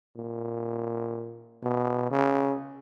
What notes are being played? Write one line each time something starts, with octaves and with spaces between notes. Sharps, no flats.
A#2
B2
C#3